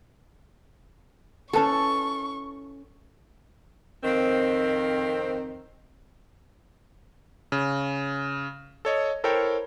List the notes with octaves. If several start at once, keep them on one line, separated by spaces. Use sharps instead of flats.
C#4 E4 A4 B4 A5 C#6
F2 D#3 C4
C#3
A4 C#5 D#5
E4 A4 A#4 C5 C#5 G5